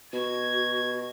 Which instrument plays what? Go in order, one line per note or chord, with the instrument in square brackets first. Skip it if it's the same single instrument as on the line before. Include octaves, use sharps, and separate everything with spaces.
[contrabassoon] B2 [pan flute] F#4 [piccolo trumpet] G#6